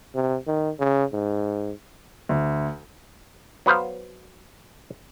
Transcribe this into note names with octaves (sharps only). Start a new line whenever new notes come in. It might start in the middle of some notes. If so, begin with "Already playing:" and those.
C3
D#3
C#3
G#2
D2
F#3 B3 B4 C5 F5